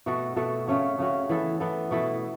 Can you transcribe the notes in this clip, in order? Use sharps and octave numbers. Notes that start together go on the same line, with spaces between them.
B2 A3 F#4 A4
B2 A3 F#4 A4
C#3 A3 C#4 F#4
C#3 A3 C#4 F#4
E3 B3 A4
E3 B3 A4
B2 A3 E4 A4